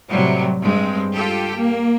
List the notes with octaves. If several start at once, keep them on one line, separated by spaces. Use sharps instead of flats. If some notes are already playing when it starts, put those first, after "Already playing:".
A2 C3 F#3 G3
G2 G#3 C4
F4 G4 A4
A#3